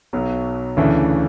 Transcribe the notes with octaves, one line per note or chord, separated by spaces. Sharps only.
B1 B2 F#3
D2 C#3 E3 A3 D4